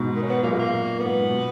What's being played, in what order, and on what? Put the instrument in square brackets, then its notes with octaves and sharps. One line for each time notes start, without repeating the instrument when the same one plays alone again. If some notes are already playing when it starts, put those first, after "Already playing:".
Already playing: [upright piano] G#2 B2
[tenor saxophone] D#3
C#4
B3
[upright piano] F#2 A#2 [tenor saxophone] A#3
[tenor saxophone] G#3
A#3
[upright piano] G#2 [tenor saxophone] B3
[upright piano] G#2
B2